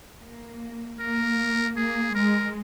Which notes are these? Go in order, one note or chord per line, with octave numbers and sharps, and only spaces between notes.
A#3
A#3 A#4
A#3 G#4
G#3 A#4